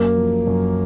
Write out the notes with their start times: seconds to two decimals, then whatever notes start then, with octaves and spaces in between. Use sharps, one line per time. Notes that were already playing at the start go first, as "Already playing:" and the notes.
Already playing: F#2 A#3
0.18 F3
0.47 F#2